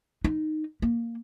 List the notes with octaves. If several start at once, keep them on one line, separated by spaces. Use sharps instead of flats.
D#4
A#3